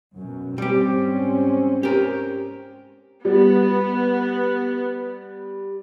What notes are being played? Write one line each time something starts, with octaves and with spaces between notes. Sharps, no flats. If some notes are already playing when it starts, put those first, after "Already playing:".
F#2 B2
G#2 G3 C4 C#4 G4
G4 A#4
G3 B3